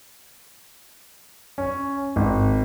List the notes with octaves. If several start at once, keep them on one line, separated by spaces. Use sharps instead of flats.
C#4
G#1